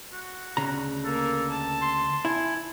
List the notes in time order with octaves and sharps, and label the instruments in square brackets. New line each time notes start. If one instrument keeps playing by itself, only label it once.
[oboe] F#4
[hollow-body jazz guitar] D2 C#3 A#5
[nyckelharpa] A#3 A#4 [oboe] A4
[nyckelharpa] A5
[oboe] C6
[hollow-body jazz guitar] E4 [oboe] G#5